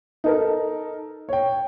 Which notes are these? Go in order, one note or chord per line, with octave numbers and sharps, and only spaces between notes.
D#4 A4 A#4
C#5 G5